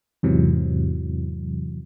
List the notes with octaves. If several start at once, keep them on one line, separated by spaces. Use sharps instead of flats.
E2 G#2 C3 E3 F#3